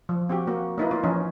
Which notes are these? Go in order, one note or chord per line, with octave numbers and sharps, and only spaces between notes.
F3
C4 F#4 G4
A#3 F#4
A#3 D#4 E4 B4
A#3 F4
E3 F3 C#4 D#4